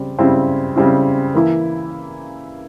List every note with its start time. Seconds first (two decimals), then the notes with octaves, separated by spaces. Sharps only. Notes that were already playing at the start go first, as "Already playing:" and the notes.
Already playing: C#3 G3 C4
0.19 C#3 G3 C4 E4
0.76 C#3 G3 C4 E4
1.34 E3 A#3 E4